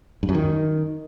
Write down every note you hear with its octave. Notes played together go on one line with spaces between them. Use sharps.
G2
F#2
D#3